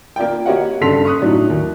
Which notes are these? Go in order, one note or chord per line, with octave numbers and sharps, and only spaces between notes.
A#3 F4 D5 G5
A#3 F#4 G4 C#5 D#5 F#5
F#1 G2 A4 C6 B6 F7
C#6 D#6 F#6
A2 F#3 D4 D#4
D#2